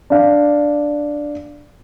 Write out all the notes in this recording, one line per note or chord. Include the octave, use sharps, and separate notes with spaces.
D4 F5